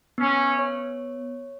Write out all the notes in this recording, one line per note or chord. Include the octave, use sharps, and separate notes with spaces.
B3 C#4
C#5